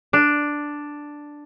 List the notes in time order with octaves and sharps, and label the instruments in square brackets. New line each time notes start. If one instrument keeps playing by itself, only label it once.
[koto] D4